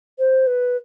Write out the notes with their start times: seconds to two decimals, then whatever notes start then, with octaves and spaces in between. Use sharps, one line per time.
0.19 C5
0.47 B4